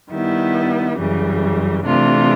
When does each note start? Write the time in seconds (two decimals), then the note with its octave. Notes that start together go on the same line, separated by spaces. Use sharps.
0.11 D#3 G3 B3 E4
0.98 F#2 C#3 E3 G3
1.85 C3 E3 A3 D4 F4